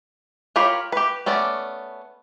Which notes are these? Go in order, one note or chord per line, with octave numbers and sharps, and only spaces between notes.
F4 G4 A#4 C#5 B5
G4 B4
A3 B3 C#4 D5